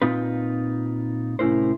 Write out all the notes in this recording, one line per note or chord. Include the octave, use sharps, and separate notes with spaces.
A#2 C4 D#4 F4 B4
C2 A2 C#4 E4 A#4 C5